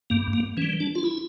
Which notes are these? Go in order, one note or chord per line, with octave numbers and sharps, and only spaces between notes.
G2 A#3
A#3
E3 G3 C#4
D4
F4
E4